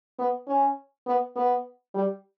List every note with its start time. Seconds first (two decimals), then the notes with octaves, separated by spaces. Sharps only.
0.19 B3
0.48 C#4
1.06 B3
1.36 B3
1.94 G3